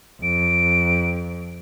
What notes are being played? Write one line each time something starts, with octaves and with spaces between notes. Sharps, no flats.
F2 D7